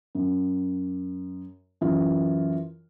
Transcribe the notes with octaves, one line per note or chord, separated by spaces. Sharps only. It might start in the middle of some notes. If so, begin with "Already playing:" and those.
F#2
F#2 E3 F4 F5